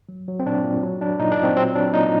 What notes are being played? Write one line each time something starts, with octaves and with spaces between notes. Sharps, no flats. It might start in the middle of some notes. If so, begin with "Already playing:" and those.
F#3
F#3
C4
A#2 D4
A#2
F#3
F#3 D4
A#2 D#4
D4
A#2
C4
F#3 C4
F#3 D4
A#2 D#4